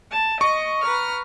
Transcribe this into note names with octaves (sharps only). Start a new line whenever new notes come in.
A5
D#5 C#6
B4 A#5 F6